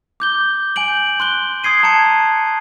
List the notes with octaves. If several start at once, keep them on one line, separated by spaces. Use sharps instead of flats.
D6 G6 G7
G#5 G6 D7 F#7
C6 F#6 G7
C6 D#6 G#6 C7 D#7
A5 A#5 G#6 C#7 D#7